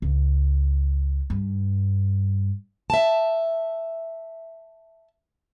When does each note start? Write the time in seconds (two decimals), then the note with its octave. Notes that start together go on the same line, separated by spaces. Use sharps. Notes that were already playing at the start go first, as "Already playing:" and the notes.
0.02 C#2
1.30 G2
2.90 E5 A5